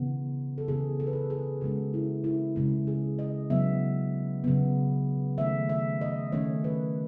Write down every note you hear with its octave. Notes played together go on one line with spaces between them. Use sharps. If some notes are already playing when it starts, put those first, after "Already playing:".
Already playing: C#3 E3 B3
A4
C#3 E3 B3 G#4
A4
B4
A4
G#4
C#3 G#3 C#4 F#4
E4
E4
C#3 G#3 C#4 E4
G#4
D#5
C#3 F#3 B3 E5
C#3 F#3 B3
D#3 A3 C#4 E5
E5
D#5
D#3 A3 C#4 C#5
B4